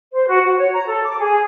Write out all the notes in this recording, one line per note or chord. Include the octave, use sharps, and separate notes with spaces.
C5
F#4
F#4
C#5
A#5
A4
D6
G#4